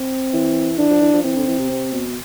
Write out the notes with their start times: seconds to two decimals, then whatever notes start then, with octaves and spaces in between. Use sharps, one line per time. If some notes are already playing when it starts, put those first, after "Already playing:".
Already playing: C4
0.33 E3
0.79 E3 D4
0.90 F3
1.01 E3
1.13 F3
1.24 E3 C4
1.36 D3
1.47 E3
1.58 C3
1.69 C3
1.93 B2